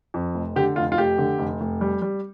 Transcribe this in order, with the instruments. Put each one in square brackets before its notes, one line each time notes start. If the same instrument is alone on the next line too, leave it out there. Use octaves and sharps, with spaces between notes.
[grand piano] F2
F1
D3 G4
F1 F4
F4
F1 G4
D3
F1
F1
G3
G3